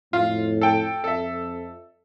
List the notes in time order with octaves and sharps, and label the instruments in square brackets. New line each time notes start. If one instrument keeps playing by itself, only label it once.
[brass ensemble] F2 A2 [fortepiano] F4
[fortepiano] A4 G5
[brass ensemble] F2 [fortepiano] A4 E5